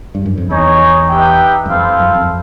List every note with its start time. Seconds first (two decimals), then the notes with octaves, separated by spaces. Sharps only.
0.15 G2
0.26 F#2
0.37 F2
0.50 E2 D#4 G#4 C#5
1.10 D#4 G4 B4 E5 G5
1.66 F#2
1.70 F2 E4 A4 C5 F5
1.99 F#2
2.15 F2